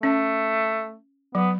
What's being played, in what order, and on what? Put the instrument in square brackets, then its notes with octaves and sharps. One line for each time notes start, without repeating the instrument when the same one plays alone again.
[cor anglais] A3 [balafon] C#4
[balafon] F#3 [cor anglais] B3